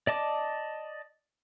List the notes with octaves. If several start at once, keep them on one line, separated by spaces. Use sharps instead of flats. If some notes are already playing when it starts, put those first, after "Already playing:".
D5 D#5 A5 D6